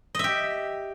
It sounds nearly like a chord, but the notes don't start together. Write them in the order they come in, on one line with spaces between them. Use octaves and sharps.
D#5 E5 G4